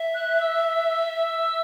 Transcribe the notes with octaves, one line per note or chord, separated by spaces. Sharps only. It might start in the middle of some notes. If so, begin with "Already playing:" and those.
Already playing: E5
F#6
E6